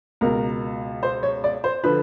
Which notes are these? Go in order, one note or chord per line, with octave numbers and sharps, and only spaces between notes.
C#2 B2 A#4
C5
C#5
D5
C5
D3 F3 B4